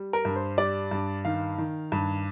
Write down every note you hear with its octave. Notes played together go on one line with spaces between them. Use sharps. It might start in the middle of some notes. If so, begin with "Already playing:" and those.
Already playing: G3
A#4
G2
C5
G3 D5
G2
D#3 F5
D#3
G2